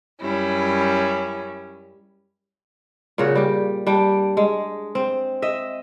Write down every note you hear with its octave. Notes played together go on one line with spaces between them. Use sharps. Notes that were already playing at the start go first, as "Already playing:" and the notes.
F#2 G3 C#4 E4
A#2 C#3 F#4
G3 G4
G3 D4 G5
G#3
C4
D#5 E5